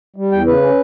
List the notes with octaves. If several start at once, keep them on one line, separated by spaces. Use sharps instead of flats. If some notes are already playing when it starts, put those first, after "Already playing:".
G3
E2 G5
C#3 B4
C#4